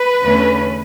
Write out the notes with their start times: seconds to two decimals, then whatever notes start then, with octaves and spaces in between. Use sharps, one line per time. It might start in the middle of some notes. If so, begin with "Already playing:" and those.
Already playing: B4
0.22 E2 D3 A3 C#4